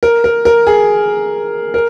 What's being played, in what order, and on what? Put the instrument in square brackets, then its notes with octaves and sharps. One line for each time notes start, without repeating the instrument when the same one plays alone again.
[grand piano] A#4
A#4
A#4
G#4
A#4